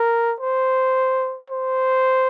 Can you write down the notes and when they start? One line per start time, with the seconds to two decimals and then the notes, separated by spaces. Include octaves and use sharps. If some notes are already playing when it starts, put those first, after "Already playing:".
Already playing: A#4
0.40 C5
1.50 C5